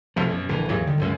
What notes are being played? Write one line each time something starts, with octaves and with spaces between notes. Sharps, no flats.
F1 B1 F2 F3
F#2 B2
A#1 D3 E3
G#1 D#2 E3 F#3
D3 D#3 G3
C#2 F#2 G#3